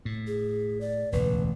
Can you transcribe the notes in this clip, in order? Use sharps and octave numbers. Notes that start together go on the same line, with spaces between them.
A2
G#4
D5
E1 A1 D2 B4